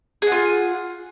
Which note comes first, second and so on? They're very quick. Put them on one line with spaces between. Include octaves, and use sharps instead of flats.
G#4 F#5 F4